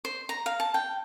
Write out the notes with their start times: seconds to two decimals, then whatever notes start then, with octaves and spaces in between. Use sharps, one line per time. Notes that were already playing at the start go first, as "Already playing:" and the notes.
0.05 C5
0.29 A#5
0.46 F5
0.60 A5
0.74 G5